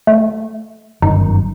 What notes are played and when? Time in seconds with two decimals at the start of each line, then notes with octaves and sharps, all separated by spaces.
0.07 A3
1.02 G1 F#2 D#3 D#4